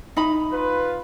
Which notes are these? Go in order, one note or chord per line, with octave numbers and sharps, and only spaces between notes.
D#4 B5
F4 B4